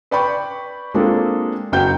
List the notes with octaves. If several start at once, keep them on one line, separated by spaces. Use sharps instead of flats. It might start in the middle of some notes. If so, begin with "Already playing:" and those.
B4 D5 G5 B5 C#6
G#3 A#3 C4 D4 F4 A4
F#1 F#4 G5 G6